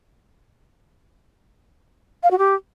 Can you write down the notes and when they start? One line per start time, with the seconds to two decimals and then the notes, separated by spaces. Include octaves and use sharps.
2.23 F5
2.31 F#4
2.38 G4